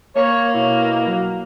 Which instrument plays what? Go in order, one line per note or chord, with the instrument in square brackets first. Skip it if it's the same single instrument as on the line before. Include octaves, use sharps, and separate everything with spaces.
[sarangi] A#3 [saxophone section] C#5
[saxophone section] B2 E4
F#3